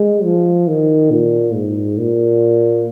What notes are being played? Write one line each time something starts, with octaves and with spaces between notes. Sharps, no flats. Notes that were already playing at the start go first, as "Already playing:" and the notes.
Already playing: G#3
F3
D#3
A#2
G#2
A#2